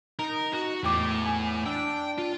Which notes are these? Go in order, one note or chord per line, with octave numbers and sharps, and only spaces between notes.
D#4 A#4
F#4
E2 A2 G5 D6
G#5
D4 G5 E6
F4